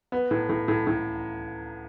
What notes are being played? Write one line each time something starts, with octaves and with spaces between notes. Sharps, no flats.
B3
A2
A2
A2
A2